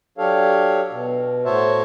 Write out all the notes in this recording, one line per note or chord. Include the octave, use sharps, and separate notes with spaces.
F#3 D4 G4 A4 C#5 F5
B2
A2 F#4 C5 C#5 E5 A5